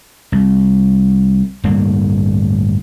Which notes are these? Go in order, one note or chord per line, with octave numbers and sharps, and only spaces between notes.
C2
D1 G2 A#3